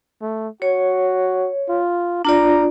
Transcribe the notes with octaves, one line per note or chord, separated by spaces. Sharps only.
A3
F#4 C#5
F4
D4 F4 D5 A#5